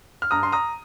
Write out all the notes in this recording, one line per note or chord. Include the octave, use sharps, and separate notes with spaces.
F6
G2 A#5 D#6
C6
A#5 D#6